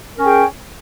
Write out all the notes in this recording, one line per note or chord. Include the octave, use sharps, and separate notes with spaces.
C#4 G#4 A#4 G5